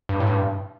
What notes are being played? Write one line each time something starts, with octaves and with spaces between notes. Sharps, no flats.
G2
A2
G2